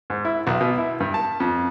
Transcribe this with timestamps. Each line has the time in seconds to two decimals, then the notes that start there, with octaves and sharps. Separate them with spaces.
0.10 G#2
0.25 E4
0.47 B1
0.61 B2
0.78 E4
1.00 G2
1.14 A5
1.40 F2